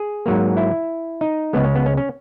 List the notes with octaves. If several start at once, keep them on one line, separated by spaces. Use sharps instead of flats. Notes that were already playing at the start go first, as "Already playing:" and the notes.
Already playing: G#4
G#2 F#3 A#3
E4
D#4
C#2 C#3 G#3 B3
C#4
B3
C#4
C#4